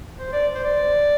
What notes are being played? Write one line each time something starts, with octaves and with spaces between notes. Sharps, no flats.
C5
D5
C5
D5